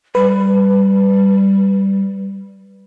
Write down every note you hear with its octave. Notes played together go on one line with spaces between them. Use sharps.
G3 B4